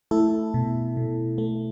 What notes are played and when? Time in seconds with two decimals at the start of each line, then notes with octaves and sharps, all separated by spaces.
0.11 A3 E4 A4
0.54 B2
0.97 B2
1.38 A3